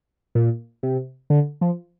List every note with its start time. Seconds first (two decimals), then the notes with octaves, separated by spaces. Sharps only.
0.35 A#2
0.83 C3
1.30 D3
1.61 F3